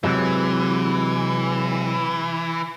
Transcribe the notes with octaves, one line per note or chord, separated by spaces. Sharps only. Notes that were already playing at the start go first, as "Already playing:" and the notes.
C3 E3 F#3 G#3